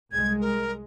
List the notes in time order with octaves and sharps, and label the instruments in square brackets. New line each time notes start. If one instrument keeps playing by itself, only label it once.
[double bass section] C2 G#3 [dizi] G#6
[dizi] A#4